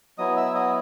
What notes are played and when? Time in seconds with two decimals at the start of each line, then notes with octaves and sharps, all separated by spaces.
0.18 F#3 B3 E4 D#5 D#6
0.37 E5 E6
0.55 D#5 D#6